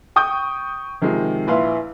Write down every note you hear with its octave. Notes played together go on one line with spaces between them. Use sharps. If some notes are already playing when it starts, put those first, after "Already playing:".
G5 C#6 D#6 G6
C3 D#3 F3 G#3
A#1 E4 B4 F5 C6